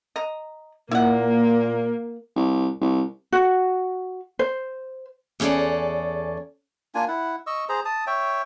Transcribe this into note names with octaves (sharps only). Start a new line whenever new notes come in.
D#5 A#5
A#2 A#3 E4 F#5
C2
C2
F#4
C5
E2 C#4 G#4 A4 D5
A#3 D4 F4 G#5
E4 F#5
D#5 C#6 E6
G#4 C5 A#5
A5 D#6
C#5 E5 G5